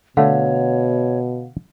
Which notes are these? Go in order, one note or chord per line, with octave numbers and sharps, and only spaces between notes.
B2 D3 A3 C#5 F5 F#5